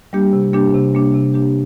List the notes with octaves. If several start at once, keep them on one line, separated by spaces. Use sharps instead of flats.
G3 A#3 D4 G4
C3
G3 A#3 D4 G4
C3
G3 A#3 D4 G4
C3
G3 A#3 D4 G4